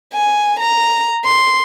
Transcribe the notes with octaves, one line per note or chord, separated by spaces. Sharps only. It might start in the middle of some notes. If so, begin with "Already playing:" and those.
G#5
A#5
C6